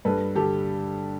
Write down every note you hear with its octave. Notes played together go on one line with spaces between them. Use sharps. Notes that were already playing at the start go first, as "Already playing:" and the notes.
G2 A4 B4
D3 G4 A4